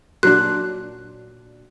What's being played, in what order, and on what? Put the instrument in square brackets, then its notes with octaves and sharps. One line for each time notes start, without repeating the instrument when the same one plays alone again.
[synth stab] A#2 F#3 D4 [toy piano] F#4 [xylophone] F#6